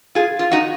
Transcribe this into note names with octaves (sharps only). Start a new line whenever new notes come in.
F4 G#4
F4
D#4 F#4